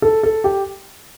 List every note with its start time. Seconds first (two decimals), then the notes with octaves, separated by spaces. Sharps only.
0.02 A4
0.23 A4
0.44 G4